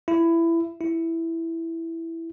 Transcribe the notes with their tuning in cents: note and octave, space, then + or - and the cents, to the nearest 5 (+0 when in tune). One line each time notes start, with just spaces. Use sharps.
E4 +15
E4 +0